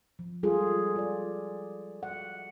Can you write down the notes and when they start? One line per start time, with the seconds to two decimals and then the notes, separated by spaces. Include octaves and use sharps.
0.19 F3
0.43 G3 F4 G#4 A4
0.96 F4 D5
2.03 F#5